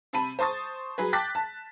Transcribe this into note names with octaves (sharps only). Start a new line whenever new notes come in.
C3 A5 B5 D#7
C5 A5 C#6 D#6 A6
F#3 G#4 B4
G5 A5 D6 F#6 A6 B6
A5